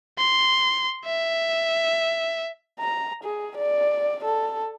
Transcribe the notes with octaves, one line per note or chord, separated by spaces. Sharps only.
C6
E5
A#5
G#4
D5
A4